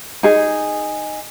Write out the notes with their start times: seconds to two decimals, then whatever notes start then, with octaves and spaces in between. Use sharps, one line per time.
0.23 D#4 G#4